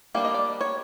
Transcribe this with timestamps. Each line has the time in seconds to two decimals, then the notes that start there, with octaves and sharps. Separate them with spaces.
0.15 G3 A#3 D4 F5
0.25 D#5
0.34 D5
0.61 C#5